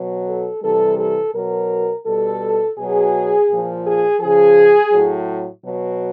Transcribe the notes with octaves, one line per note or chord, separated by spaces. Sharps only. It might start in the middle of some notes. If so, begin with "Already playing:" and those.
Already playing: B2 F#3
A4
C3 E3 G3 A4
A4
B2 F#3 A#4
B2 G3 A4
B2 F#3 G#4
A#2 F3
G#4
C#3 F3 G#4
A2 F#3
B2 F#3